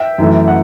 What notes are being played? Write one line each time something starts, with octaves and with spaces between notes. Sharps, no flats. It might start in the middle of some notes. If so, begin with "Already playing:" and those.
Already playing: E5 G5
F#2 E3 A3 E4
F#5